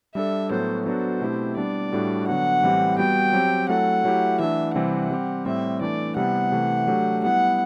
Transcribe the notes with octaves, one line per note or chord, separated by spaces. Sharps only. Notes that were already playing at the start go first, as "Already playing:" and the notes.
G3 D4 A4 E5
A2 F#3 B3 F#4 A4 C5
F#3 B3 D4 F#4 A4 C5
B2 A3 C4 E4 G4
G3 B3 D4 D5
A2 G3 D4 F#4 A4
D3 F#3 B3 F#4 F#5
A2 E3 G3 C4 G4
G3 B3 F#4 G5
F#3 C4 G4
F#3 A3 E4 A4 F#5
F#3 A3 E4 G4
E3 A3 D4 E5
C3 E3 G3 C4 G4 F#5
G3 C4 G4
A2 G3 C4 G4 E5
E3 A3 D4 D5
C3 G3 B3 E4 F#5
C3 E3 A3
F#3 A3 D4 G4
G3 B3 E4 F#5